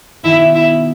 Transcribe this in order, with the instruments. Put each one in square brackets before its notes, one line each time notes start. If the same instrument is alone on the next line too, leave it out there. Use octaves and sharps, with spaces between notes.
[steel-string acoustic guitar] B2 D#3 [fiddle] E4
[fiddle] E4